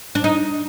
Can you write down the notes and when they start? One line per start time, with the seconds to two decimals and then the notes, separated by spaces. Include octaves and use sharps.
0.15 D4
0.24 D#4